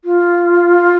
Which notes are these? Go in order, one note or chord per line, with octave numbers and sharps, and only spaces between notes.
F4